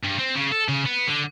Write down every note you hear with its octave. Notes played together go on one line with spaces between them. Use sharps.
G2
C4
C#3
A4
C#3
B3
D3